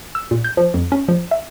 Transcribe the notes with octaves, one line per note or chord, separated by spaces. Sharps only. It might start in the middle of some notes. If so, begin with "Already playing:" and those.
E6
A#2
G6
F3
F2
C#4
F3
E5